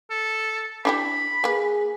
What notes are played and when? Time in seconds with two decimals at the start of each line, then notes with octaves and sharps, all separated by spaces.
0.10 A4
0.85 D4 E4 G4 B5
1.44 A#3 G#4 B4